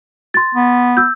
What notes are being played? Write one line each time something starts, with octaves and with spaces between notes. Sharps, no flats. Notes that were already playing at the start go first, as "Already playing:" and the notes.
C6 A6
B3
E6 G6